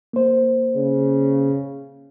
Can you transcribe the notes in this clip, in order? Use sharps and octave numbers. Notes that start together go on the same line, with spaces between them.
A#3 C5
C#3